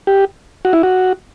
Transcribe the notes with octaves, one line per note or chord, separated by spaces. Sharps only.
G4
F#4
E4
F#4